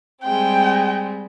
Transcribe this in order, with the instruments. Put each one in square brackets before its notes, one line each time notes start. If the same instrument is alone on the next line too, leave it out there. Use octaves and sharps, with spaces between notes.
[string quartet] G3 G#3 C4 [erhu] G5